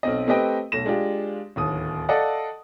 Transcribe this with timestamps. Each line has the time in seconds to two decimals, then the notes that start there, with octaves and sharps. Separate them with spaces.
0.03 B1 C4 D#5
0.27 A3 C4 G4 B4 D#5 G5
0.72 B1 A3 A#6 E7
0.86 G#3 D4 F4 G4
1.56 D1 D#2 D#6
2.09 A4 D5 D#5 F5 F#5